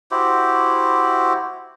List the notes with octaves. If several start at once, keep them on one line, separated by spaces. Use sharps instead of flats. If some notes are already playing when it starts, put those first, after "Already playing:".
E4 F#4 G4 C5